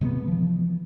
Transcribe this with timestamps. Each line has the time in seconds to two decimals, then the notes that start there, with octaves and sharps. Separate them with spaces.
0.01 C3 G#3 A3 B3
0.28 E3 F3